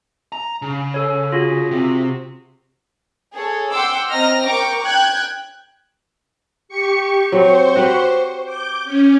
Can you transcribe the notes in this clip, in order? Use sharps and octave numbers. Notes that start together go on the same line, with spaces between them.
A#5
C#3
A4 C#5
F4 F#4 G#4
C3
G#4 A4 C#5
F#5 G5 C6 D6 E6
C4 D#5 A#5 F6 A#6
A#4 G5 C#6 D6
G5 F#6 G#6
G4 C#6 C#7
F#3 C4 C5 C#6
F#4 G4 B4
D6 G6
C#4